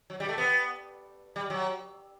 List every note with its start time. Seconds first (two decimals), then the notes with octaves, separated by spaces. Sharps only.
0.10 F#3
0.20 G3
0.29 A3
0.38 B3
1.36 G3
1.50 F#3